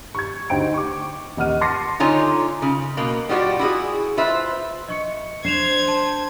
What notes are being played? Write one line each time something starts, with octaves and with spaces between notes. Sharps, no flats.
C#6 G#6
D2 D#4 C5 G5 D7
C#6 D6
D#1 D#5 F#5 F6 D#7
A5 C6 D6 A#6 C7 C#7
D3 D#4 F4 C#5 G#5
C#3
B2 A#3
G3 F4 F#4 C#5 D5
E4 F#4 G#4
F4 B4 C5 E5
D#5 C#6 C#7
D4 C5 G#6 C7 E7 F7
A5